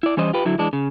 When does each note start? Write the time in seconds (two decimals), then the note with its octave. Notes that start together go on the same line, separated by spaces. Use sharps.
0.03 E4 D5
0.17 E3 G3 C#4 C5 D#5
0.33 F4 G4 B4
0.45 D3 F#3 E4
0.58 E3 G#3 D4
0.73 C#3